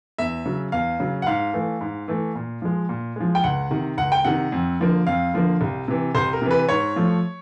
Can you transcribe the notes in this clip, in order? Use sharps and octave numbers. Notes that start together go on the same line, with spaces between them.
E2 E5
C#3 F#3
E2 F5
C#3 F#3
F#5
G#2 F5
E3 A3
G#2
E3 A3
A#2
F3 G#3
A#2
F3 G#3
G5
C#2 F#5
C3 D#3
C#2 F#5
G5
C3 D#3 F#5
F2
D3 F3 A#3
F2 F5
D3 F3 A#3
C2
C3 E3
C2 C5
A#4
C3 E3
B4
G#2 C#5
F3 A3